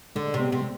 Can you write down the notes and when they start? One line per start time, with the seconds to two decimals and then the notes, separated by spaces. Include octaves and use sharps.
0.15 D3 G#3
0.34 C3
0.39 B3
0.52 C3